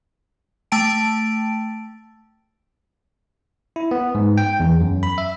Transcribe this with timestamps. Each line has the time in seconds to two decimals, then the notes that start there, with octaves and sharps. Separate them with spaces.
0.72 A3 G5 A5 D7
3.76 E4
3.91 B3
4.15 G#2
4.37 G5
4.60 E2
4.81 F#2
5.03 B5
5.18 E5